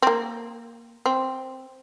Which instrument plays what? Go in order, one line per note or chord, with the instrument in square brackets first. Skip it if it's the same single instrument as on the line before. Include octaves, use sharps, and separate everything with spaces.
[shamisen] C4
A#3
C4